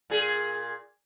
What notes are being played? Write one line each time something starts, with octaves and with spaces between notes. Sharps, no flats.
A#2 G#4